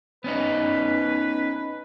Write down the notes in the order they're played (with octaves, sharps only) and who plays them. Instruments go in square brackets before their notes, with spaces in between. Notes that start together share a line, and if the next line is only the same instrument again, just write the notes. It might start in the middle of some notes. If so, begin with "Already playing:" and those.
[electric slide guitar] B3 C#4 D#4 [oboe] B4